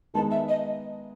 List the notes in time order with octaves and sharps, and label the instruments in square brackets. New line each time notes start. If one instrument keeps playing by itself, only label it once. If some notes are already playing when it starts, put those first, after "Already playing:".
[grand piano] D#3 G#3 B3 D#4 [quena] A5
[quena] E5
D#5